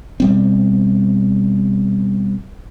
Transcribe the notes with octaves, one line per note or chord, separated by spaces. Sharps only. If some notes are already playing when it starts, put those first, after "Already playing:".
B2 G3 C4